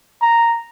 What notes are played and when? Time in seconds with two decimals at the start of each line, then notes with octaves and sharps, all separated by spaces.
0.22 A#5